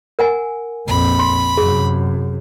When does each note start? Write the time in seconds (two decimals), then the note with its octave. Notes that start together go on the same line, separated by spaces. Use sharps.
0.19 A#4 F#5 G#5
0.88 A#1 F2 B5
1.19 C6
1.57 F#2 C3 G#4